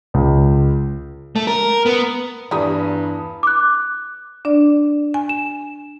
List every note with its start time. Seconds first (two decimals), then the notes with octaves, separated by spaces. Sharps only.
0.14 C#2
1.36 A3
1.47 A#4
1.86 B3
2.51 E2 G2 G3 A3 A#5 B5 D#6
3.43 D6 F#6
4.45 D4 D5
5.14 G#5
5.29 E7